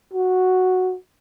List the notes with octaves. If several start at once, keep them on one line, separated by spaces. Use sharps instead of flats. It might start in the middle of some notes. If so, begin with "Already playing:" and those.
F#4